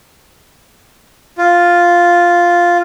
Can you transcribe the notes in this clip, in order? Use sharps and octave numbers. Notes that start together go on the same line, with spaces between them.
F4